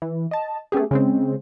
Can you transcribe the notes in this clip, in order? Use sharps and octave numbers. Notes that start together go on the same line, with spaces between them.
E3
D#5 A5
A3 B3 C#4 G4 G#4
C#3 G#3 C4